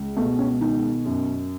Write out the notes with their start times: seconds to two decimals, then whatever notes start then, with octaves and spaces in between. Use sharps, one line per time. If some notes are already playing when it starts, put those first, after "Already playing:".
Already playing: C#2
0.16 B2 A3
0.38 C#4
0.61 D#3 D#4
1.06 F#2